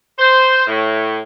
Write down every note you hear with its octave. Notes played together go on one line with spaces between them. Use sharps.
C5
A2